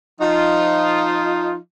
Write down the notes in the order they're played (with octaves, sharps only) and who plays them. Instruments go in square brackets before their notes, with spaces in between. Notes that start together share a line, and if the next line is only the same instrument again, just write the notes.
[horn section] F3 D#4 F4